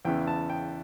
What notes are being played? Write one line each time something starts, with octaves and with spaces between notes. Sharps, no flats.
E2 C#3 E3 B3 G5
A5
G5